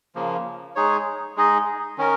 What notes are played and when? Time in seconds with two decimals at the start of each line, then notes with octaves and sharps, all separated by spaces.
0.15 C#3 F3 A#3
0.76 G#3 D#4 G#4 C#5
1.37 G#3 D#4 G#4 D#5
1.98 D#3 C#4 A#4